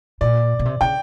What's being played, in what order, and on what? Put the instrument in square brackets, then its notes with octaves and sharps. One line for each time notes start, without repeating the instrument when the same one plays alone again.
[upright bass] A#2 [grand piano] D5
[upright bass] B2
C3
[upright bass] C#3 [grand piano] G5